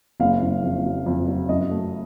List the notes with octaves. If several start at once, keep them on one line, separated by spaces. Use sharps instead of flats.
F#1 F5
F#1
F2
F#3
F2
F#3
F#2 D#5
A3